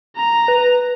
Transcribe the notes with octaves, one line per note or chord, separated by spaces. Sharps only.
A#5
B4